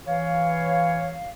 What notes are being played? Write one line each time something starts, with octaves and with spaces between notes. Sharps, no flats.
E3 C#5 F5